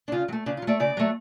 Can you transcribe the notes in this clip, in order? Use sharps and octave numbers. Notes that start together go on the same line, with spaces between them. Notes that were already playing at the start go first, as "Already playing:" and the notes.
D4
C#3 F4
F#3
A3
C#3 D4
F4
F#3
A3 D5
C#3 D5
F#3 A3